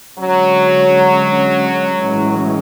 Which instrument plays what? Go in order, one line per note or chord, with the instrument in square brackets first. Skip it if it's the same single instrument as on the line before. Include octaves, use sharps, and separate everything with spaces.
[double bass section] D3 G#3 C#4 [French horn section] F#3
[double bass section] A2 E3 G#3 C#4